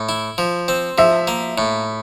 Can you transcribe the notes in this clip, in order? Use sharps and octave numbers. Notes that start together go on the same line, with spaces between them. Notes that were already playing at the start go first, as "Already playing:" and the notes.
Already playing: A2
E4
F3
C4
F3 E5
A#3
A2